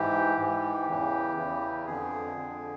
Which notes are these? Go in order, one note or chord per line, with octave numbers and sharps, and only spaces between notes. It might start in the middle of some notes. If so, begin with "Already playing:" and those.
Already playing: G#2 E3 G4
G#2 E3
E2 C#3 E3
E2 C#3 E3
F2 D3 G#4
F2 D3